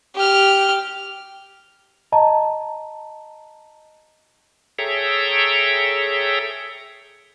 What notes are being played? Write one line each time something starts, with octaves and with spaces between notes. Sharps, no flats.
G4 F6
D#5 A5 A#5
G#4 A4 C#5 E5 G5 A#5